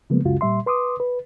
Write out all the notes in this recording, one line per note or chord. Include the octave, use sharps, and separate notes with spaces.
C#3 F3 F#3 G#3 A#3 B3
C#2 F#2 C#3 G#3 F4 F#4
A#2 G3 E5 C6
B4 C6 D6 D#6
B4